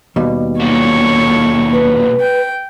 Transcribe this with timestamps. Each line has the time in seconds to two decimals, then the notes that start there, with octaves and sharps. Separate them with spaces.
0.16 D#2 B2 G3
0.60 B1 A#2 A4 C#5
1.72 B4
2.20 G5